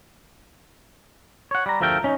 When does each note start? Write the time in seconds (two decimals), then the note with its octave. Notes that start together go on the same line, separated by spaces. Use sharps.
1.51 C#5 F#5
1.66 G3 A#5
1.81 D2 F3 A3 A4 A#4 G5
2.04 C#4 D#4